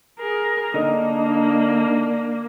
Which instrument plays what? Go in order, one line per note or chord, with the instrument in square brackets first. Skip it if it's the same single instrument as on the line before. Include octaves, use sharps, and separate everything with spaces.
[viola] G#4 A#4
[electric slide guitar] D3 D#4 [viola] A#3 [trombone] D4